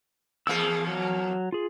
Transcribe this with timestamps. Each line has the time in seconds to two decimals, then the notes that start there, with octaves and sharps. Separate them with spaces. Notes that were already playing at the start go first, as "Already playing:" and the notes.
0.47 E2 F3 A#3 G#4 E6
0.87 F#3
1.52 F4 G#4